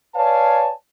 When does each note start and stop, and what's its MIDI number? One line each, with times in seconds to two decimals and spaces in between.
0.15 0.71 71
0.15 0.71 73
0.15 0.71 74
0.15 0.71 77
0.15 0.71 80
0.15 0.71 81